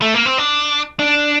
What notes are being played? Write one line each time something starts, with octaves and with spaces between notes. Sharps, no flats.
A3
A#3
C4
D4
D4